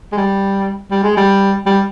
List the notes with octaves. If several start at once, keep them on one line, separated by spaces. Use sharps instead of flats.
G#3
G3
G3
G#3
G3
G3